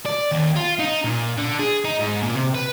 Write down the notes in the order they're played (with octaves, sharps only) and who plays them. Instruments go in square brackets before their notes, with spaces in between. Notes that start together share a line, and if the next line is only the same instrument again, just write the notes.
[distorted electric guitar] D5
D#2
F4
D#4
A#2
D3
G#4
D#4
G#2
A#2
C3
B4